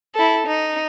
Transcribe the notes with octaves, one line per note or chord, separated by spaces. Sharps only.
E4 A4
D#4